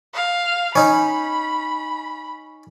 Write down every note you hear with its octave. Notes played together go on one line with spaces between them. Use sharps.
F5
C#4 D#4 B5